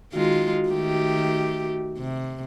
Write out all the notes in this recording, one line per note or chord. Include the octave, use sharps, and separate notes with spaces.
D#3 G#3 F4 F#4
D#3 A3 G4
C3